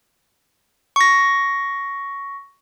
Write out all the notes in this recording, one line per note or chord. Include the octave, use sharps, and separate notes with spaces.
C#6 A#6